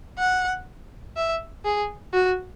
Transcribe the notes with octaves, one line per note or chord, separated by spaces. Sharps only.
F#5
E5
G#4
F#4